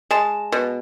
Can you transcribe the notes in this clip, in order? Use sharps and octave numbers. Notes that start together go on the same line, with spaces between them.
G#3 A5
B2